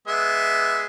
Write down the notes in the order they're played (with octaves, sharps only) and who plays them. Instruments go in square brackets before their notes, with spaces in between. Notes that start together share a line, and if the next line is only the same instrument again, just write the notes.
[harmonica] G#3 B3 E5